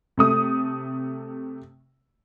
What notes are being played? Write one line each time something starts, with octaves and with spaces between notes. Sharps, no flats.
C3 A3 D#6